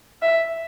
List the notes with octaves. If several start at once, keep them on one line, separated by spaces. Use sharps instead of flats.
E5